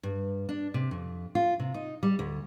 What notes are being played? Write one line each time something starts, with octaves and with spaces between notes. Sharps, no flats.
G2
D4
C3
F2
F4
C3
D#4
G3
D2